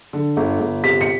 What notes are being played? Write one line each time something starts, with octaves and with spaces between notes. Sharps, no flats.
D3
G1
G1
C3 B6
C#7